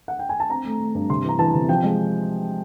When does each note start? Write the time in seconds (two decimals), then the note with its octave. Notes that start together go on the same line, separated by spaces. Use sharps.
0.08 F#5
0.19 G5
0.29 G#5
0.40 A5
0.50 C4 A#5
0.65 A3
0.80 A3
0.95 G2
1.10 C3 C6
1.25 E3 A#5
1.39 E3 A5
1.54 C3
1.69 F3 G5
1.83 G#3